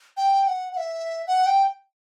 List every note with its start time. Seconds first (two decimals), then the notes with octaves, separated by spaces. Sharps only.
0.17 G5
0.44 G5
0.47 F#5
0.72 F#5
0.77 E5
1.27 F#5
1.46 G5